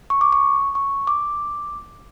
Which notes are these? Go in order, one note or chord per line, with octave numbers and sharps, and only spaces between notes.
C#6
D6
C#6
C#6
D6